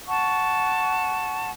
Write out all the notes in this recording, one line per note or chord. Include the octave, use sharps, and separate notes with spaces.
F#5 A5 C#6